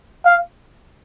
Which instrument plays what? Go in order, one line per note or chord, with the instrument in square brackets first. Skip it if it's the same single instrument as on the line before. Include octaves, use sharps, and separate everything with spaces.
[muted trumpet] F5